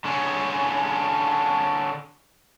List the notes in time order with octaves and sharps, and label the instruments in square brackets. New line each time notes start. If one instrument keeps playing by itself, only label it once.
[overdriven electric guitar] D3 C#4